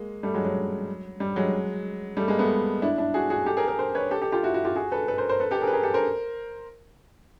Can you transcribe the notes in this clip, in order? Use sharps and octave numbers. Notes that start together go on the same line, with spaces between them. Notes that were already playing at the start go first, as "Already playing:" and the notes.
Already playing: G#3 A#3
G3 A3
F#3 G#3
F#3
G3
F#3 G#3
G3 A3
G#3 A#3
A3 B3
D4 E4
D4 E4
F#4 G#4
F#4 G#4
G4 A4
G#4 A#4
G#4 A#4
A#4 C5
B4 C#5
G4 A4
G4 A4
F4 G4
E4 F#4
E4 F#4
F4 G4
F#4 G#4
A4 B4
A4 B4
A#4 C5
A#4 C5
A4 B4
G4 A4
G#4 A#4
B4
G#4 A#4
G4 A4
A#4 C5